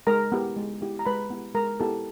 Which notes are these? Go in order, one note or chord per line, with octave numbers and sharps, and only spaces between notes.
G#3 A#4 A#5
B3 E4 G4
G#3
B3 E4 G4
A#5
G#3 B4 B5
B3 E4 G4
G#3 A#4 A#5
B3 E4 G4 A4 A5